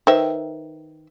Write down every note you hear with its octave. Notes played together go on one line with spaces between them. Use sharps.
D#3 B4 C5 E5 G5